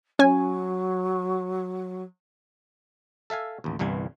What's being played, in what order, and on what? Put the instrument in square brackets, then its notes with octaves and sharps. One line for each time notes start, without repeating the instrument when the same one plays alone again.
[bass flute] F#3 [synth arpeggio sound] C#4 G#5
[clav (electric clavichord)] A4 E5 F5 G#5
A1 D#2
G1 C2 G2 E3 G#5